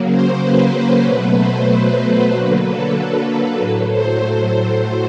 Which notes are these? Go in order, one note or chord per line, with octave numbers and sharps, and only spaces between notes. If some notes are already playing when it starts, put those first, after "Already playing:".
Already playing: C#3 F#3 A#3
C5
B4
B4
B2 F#3 A3 B4
C5
D3 F#3 A#3 B4
A4
A2 F#3 A3 B4
C5